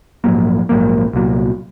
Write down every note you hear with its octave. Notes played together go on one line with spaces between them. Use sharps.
A#1 G#2 F#3 A#3
A#1 G#2 F#3 A#3
C2 A#2 F#3